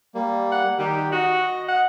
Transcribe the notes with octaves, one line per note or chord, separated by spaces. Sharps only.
G3 A#3
F#5
D#3 G3 G4
F#4 D#5
F#5